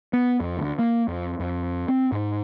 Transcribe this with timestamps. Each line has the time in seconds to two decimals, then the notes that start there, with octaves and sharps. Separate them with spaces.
0.13 B3
0.40 F2
0.57 D2
0.79 A#3
1.08 F2
1.40 F2
1.88 C4
2.12 G#2